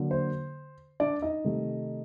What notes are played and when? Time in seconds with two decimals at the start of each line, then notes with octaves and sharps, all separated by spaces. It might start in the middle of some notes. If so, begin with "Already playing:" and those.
Already playing: D3 F#3 A#3
0.11 C5
1.00 D4 D5
1.22 D#4 D#5
1.44 C3 D#3 A3